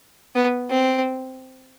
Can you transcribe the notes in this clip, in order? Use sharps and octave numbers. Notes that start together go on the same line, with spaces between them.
B3
C4